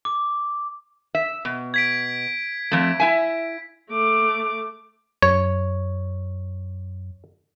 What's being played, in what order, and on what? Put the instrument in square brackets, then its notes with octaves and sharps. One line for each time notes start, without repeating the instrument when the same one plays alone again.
[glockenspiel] D6
[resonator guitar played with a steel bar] E5
B2
[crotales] G#6 B6 D7
[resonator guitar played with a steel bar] F2 A3
E4 E5 G#5
[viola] A3 D6
[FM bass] F#2 [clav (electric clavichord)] C#5